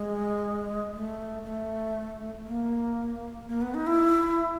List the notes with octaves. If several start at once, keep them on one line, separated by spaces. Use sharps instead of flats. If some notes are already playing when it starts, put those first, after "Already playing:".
Already playing: G#3
A3
A3
A#3
A#3
B3
D#4
E4